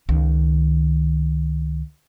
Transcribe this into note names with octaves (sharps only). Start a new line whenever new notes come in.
C#2 D#3